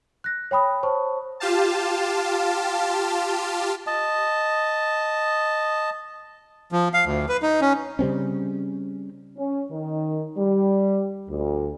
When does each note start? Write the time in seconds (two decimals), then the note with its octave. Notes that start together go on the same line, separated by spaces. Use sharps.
0.24 F#6 A#6
0.51 C#5 G5 B5 D#6
0.83 C5 C#5 A5 C#6
1.40 F4 G4 F5 A5
3.87 D#5 A5
6.72 F3
6.94 F5
7.05 D2
7.29 B4
7.42 D#4
7.61 C#4
7.99 C#3 G3 C4 C#4
9.37 C#4
9.71 D#3
10.37 G3
11.28 D2